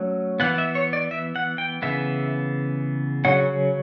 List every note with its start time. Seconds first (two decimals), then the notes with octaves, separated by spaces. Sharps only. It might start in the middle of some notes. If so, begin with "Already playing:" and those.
Already playing: F#3 A3 C#4
0.40 E3 B3 F#5
0.58 E5
0.75 C#5
0.93 D5
1.11 E5
1.36 F#5
1.58 G5
1.82 C#3 E3 B3 E5
3.25 C#3 F#3 C#4 F#5